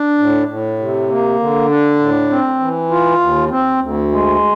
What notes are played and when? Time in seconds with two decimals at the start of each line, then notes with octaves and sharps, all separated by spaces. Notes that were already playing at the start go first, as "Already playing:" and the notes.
Already playing: D4
0.18 A2
0.48 A2
0.79 C3
1.09 A#3
1.39 D3
1.69 D4
1.99 A2
2.30 C4
2.60 E3
2.90 F4
3.20 D#2
3.51 C4
3.80 D2
4.11 G#3